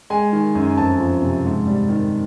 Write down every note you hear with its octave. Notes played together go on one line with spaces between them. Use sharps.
G#3 G#5
D#3
F#2
F2 A5
F3
C3
G#2
G3
D#3